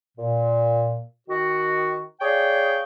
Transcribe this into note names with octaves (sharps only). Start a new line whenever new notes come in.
A#2
D#3 F#4
G#4 C#5 D5 F5 G5